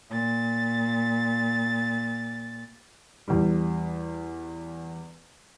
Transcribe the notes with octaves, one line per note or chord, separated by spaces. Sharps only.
A#2 A6
E2 G3